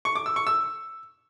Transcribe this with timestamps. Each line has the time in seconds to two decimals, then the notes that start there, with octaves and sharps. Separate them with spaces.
0.05 C#6
0.15 D6
0.26 E6
0.36 C#6
0.47 E6